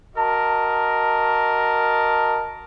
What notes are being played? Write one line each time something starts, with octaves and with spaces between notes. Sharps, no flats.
F#4 A#4 D#5 A5